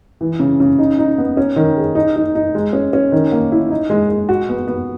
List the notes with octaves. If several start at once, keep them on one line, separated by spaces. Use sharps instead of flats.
E3
C#3
C#3
D#4
D#4
B3
C#4
D#3
G#4
D#4
D#4
D#4
G#3
C#4
C#4
D#3
A#3
E4
D#4
G#3
G#3
F#4
B3
B3